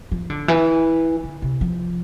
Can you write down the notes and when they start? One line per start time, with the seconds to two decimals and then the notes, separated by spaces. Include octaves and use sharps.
0.11 F3
0.30 D3
0.48 E3
1.23 D3
1.42 C3
1.61 F3